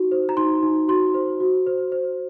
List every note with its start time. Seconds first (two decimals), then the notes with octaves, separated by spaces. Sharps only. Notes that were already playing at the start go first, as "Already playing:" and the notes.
Already playing: D#4 F#4
0.12 C5
0.29 A#5
0.37 D#4 C6
0.63 D#4
0.88 F#4 C6
1.14 C5
1.40 F#4
1.67 C5
1.92 C5